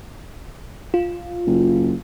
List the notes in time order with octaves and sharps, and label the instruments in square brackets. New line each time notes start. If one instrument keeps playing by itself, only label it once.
[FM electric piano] F4
[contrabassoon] F#1